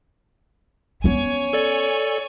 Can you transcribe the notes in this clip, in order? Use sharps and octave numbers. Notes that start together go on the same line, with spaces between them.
B3 C#4 C#5 G#5
A4 D5